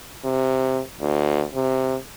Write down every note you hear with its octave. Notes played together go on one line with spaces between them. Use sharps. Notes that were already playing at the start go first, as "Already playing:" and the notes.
C3
D2
C3